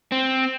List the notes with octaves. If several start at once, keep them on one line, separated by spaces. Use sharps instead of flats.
C4